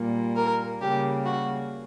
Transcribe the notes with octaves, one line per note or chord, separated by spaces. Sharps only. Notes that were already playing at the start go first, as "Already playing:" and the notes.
Already playing: A#2 G3 A#3
A#4
C#3 G3 A#3 G4
F#4